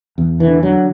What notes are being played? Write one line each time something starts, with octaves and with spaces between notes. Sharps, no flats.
E2
E3
D3
D3 F#3